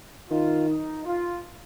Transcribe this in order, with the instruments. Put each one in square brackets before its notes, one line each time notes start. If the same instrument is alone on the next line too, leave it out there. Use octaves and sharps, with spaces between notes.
[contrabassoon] D#3 [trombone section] F4
[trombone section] D#4
F4